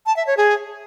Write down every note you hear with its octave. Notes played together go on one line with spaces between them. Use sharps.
A5
E5
C#5
G#4